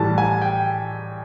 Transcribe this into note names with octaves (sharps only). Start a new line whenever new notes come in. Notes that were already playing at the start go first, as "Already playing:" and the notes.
Already playing: A2 E3 G3 A5
G#5
G5